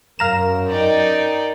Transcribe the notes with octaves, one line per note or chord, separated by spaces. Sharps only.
F#2 A#4 F5 A#5 E7
D#4 D5 G5